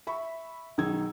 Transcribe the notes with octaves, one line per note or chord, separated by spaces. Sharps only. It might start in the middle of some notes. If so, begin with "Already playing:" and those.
E5 B5 C#6
B1 D#3 D#4 G#4 E6 G#6